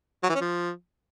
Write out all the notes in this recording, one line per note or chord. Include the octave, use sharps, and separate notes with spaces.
F#3
E3
C#4
F3